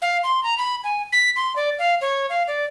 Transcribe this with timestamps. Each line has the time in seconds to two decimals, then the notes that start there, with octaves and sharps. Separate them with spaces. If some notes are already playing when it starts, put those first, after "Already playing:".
0.02 F5
0.24 C6
0.43 A#5
0.58 B5
0.84 G#5
1.12 B6
1.36 C6
1.56 D5
1.79 F5
2.01 C#5
2.30 F5
2.47 D5